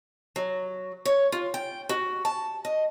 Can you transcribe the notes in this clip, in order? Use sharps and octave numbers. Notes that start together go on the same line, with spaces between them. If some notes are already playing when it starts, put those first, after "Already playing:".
F#3
C#5
F4
G5
F#4
A5
D#5